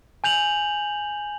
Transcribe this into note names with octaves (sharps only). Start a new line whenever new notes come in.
G#5 G6 F7 F#7